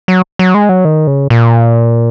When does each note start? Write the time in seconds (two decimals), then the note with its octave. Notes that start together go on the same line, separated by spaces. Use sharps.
0.08 F#3
0.39 F#3
0.54 G#3
0.69 F#3
0.85 D#3
1.07 C#3
1.30 A#2